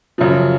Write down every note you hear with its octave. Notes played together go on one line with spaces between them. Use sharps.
F#2 C#3 F3